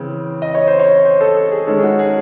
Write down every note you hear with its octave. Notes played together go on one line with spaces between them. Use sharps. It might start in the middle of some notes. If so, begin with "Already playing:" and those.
Already playing: C#3 E3 C4
D#5
C#5
C5
C#5
C5
A4
A4
G#4
D#3 G#3 C#4 A4
G#4
F#4
G#4